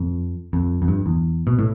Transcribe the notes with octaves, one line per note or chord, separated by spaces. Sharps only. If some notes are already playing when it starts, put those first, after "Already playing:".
Already playing: F2
F2
F2
G2
E2
B2
A2